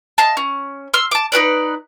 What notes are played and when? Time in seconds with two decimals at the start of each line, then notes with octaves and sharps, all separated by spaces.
0.18 D#5 F5 A5
0.37 C#4
0.94 C6 E6 F6
1.11 A5 D6
1.32 D#4 F#4 B4 D5